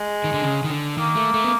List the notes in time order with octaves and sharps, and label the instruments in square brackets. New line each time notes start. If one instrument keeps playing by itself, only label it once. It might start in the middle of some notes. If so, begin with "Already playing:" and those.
Already playing: [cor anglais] G#3
[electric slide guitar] D#3
D3
C#3
D#3
D3
[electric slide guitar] D#3 [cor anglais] A#3
[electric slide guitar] A3
A3
B3